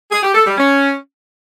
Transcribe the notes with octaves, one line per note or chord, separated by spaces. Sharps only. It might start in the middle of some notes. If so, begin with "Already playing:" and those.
G#4
G4
A4
G3
C#4